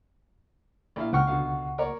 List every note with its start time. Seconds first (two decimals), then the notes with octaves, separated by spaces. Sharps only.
0.96 A#1 E4 F5
1.13 C#2 F#5 G5 C#6 F6
1.27 B2 D3 F5
1.78 A#4 C#5 D5